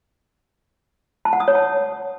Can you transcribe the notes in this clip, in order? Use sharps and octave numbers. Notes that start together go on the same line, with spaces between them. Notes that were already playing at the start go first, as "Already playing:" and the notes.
A5
F#5
D#6
C#5
A5